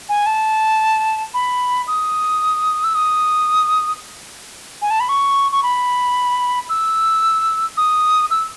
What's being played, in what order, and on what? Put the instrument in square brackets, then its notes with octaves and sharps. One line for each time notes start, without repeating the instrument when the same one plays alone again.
[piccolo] G#5
A5
B5
D#6
E6
D#6
G#5
A5
B5
C#6
C#6
B5
E6
D#6
E6